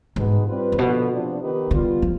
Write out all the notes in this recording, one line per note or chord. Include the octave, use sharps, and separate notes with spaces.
G#2 B2 B3 D#4 G#4 B4
G3 C4 F4 B4
G#2
B2 D3 F3 B3
C3 F3 B3 D4
D#3 B3 D#4 G4 B4
D3 G3 B3 F4
F3